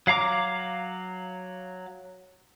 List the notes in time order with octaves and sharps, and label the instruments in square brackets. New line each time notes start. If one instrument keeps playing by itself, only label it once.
[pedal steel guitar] F#3 F5 A#5 D6